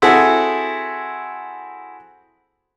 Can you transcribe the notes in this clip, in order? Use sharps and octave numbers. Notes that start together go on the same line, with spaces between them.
C4 E4 F#4 G#4 A4